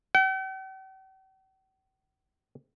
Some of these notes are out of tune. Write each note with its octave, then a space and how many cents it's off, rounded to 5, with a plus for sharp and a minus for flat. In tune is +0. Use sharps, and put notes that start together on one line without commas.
G5 -45